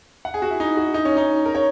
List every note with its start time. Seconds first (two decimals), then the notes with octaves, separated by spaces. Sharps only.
0.25 F#5
0.34 G#4
0.42 F#4
0.51 E4
0.60 D#4
0.77 F#4
0.94 D#4
1.05 C#4
1.17 D#4
1.46 A#4
1.55 C#5